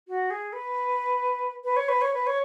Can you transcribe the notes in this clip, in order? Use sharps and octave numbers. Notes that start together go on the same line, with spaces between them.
F#4
G#4
B4
B4
C#5
B4
C#5
B4
C#5